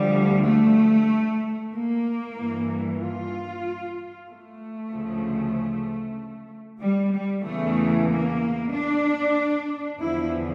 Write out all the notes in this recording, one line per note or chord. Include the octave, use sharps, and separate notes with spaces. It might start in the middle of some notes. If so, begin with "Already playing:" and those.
Already playing: D2 D3 F3 G3
A3
A#3
G2 E3
F4
A3
D2 C#3 F3
G3
G3
E2 C#3 E3 A3
A#3
D4
E2 D3 F3 E4